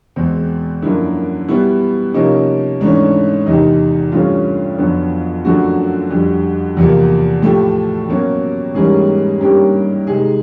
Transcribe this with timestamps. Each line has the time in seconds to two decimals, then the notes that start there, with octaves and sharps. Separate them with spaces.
0.16 E2 B2 G#3 C4
0.82 F#2 D3 F3 A#3 E4
1.48 B2 G3 B3 E4
2.14 C3 F3 A#3 C#4 D#4
2.80 G#2 E3 A3 C#4 D4
3.46 E2 C3 D#3 D#4
4.12 G2 E3 A3 C#4 F4
4.78 F2 D3 F#3 B3
5.45 F#2 D3 F3 A3 C4 F#4
6.11 F2 D3 G3
6.77 E2 C3 F3 A#3
7.42 A2 F3 A3 G4
8.09 B2 F#3 A#3 C#4
8.75 G#2 E3 G3 A#3 C#4 G#4
9.41 G2 D#3 G3 A#3 C#4 G4
10.07 C3 D#3 G#3 G#4